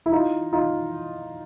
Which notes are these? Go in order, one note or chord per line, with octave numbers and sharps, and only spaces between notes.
E4
D#4 F4
D#4 F4